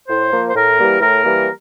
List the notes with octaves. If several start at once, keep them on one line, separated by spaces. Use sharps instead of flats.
A2 C5
F3 A#3
C5
A2 A#4
E3 G3 A#3
A2 A#4
E3 G3 A#3